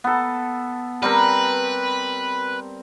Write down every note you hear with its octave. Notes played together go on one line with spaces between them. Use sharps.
B3 A4
G3 C4 A#4 B4